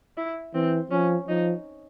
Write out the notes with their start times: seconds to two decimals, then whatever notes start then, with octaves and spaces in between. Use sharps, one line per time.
0.17 E4
0.54 E3 C4
0.91 F3 C#4
1.28 F3 D#4